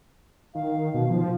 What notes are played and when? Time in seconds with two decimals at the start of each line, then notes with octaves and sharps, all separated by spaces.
0.55 D#3 F5
0.94 B2
1.10 F3